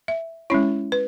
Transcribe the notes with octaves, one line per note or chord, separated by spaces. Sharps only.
E5
G#3 C#4 E4 C#5
B4